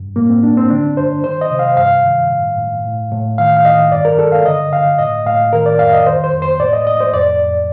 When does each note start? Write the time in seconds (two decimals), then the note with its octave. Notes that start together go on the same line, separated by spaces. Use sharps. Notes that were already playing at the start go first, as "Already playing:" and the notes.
Already playing: G2
0.16 A2 A#3
0.30 C4
0.43 A2 D4
0.57 C4
0.70 D3 D4
0.97 G2 C5
1.24 D#3 C5
1.41 D#5
1.51 C3
1.59 F5
1.77 G2 F5
2.04 D#3
2.31 A2
2.57 A2
2.85 A2
3.12 A2
3.38 D#3 F5
3.57 F5
3.65 D#3 D#5
3.92 G2 D5
4.05 A#4
4.19 G2 A4
4.32 F5
4.46 D3 D#5
4.72 D3 F5
4.99 A2 D#5
5.26 A2 F5
5.53 D#3 A#4
5.66 D5
5.79 F2 F5
5.93 D#5
6.06 D#3 C5
6.24 C5
6.33 F2
6.42 C5
6.60 A2 D5
6.73 D#5
6.87 A2 D#5
7.00 C5
7.13 F2 D5
7.40 F2